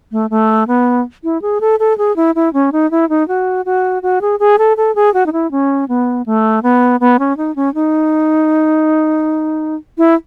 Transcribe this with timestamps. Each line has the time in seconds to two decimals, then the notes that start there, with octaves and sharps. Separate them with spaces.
0.12 A3
0.30 A3
0.68 B3
1.24 E4
1.42 G#4
1.61 A4
1.80 A4
1.98 G#4
2.16 E4
2.35 E4
2.53 C#4
2.72 D#4
2.91 E4
3.09 D#4
3.28 F#4
3.65 F#4
4.03 F#4
4.21 G#4
4.40 G#4
4.58 A4
4.77 A4
4.95 G#4
5.14 F#4
5.26 D#4
5.33 E4
5.51 C#4
5.89 B3
6.26 A3
6.63 B3
7.00 B3
7.19 C#4
7.37 D#4
7.56 C#4
7.74 D#4
9.98 E4